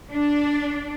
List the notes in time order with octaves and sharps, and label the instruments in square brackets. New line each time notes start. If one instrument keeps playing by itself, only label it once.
[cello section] D4